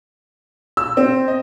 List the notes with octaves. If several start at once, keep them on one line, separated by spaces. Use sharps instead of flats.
E6
C4
D#5